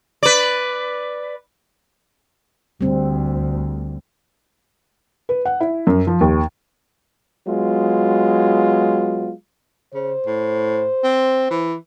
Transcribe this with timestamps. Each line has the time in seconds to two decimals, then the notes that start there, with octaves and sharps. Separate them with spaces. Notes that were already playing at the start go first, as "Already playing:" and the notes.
0.23 B4 D5
2.81 D2 G3 C4
5.29 B4
5.45 F#5
5.60 E4
5.87 F#2
6.07 F3
6.21 D#2
7.47 F#3 G#3 B3 F4
9.94 C#3 C5
10.27 A2
11.04 C4
11.51 E3